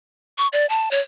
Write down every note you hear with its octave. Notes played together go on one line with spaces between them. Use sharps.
C#6
D5
A5
C#5